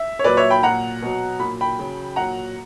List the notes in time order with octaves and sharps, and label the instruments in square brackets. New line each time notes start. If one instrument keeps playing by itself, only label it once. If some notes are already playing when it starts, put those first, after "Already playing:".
Already playing: [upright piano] E5
C#5
A#2 F#3 B4 D5
C#5 E5
G5 B5
A#2 F#3 F#5 A#5
B2 F#3
A#2 F#3 B5
G5 B5
C#3 F#3
A#2 F#3 F#5 A#5